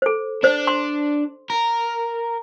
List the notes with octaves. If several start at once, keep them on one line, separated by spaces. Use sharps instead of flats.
A4 C5
D4 C5
C6
A#4